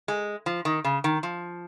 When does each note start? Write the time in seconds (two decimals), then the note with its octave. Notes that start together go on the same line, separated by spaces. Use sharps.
0.08 G#3
0.46 F3
0.65 D#3
0.84 C#3
1.04 D#3
1.23 F3